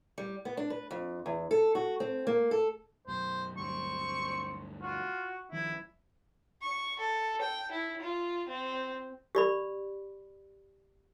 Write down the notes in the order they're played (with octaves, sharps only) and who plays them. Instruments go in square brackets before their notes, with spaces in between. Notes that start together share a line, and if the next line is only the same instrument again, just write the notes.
[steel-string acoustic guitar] G3
B3
D4
B4
F2
E2
A4
F#4
C4
A#3
A4
[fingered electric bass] F#2 B2 F#3 [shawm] C5
[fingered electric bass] D2 G2 F#3 [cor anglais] C4 [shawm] C#6
[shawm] F4 [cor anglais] F#4
[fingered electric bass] D#3 F3 C#4 [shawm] E4
[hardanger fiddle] C#6
A4
G5
E4
F4
C4
[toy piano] G4 D5 B5